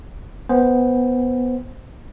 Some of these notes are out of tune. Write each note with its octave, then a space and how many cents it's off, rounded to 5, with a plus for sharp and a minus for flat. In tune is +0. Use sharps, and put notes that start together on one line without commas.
B3 +0 C5 +0 G#5 -45